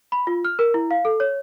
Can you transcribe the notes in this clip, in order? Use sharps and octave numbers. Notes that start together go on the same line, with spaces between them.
B5
F4
F6
A#4
E4
F5
A4
C#5